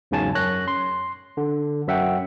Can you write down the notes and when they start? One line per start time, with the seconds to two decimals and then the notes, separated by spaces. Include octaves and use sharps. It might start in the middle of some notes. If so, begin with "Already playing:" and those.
0.11 E2 G#2 C#3 F#3 G#5 A5
0.35 F#2 C#5 F#6 A#6
0.68 C6
1.37 D3
1.87 F#2 F#3 E5 F#5 G5